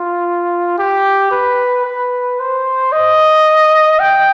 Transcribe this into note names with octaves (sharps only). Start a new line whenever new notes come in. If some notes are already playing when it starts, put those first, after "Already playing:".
Already playing: F4
G4
B4
B4
C5
D#5
G5